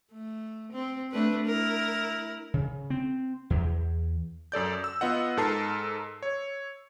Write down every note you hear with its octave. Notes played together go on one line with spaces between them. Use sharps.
A3
C4
A3 D4 B4
E4 A#4
C#3
C4
E2
F#2 A4 D5 G6
E6
B3 F4 D#5 F#5
G#2 A4 A#4 A5 C7
C#5